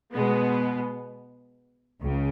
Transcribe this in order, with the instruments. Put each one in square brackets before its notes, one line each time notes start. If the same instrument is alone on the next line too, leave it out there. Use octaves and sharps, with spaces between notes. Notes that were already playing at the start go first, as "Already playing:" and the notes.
[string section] B2 G#3 B3
C#2 C#3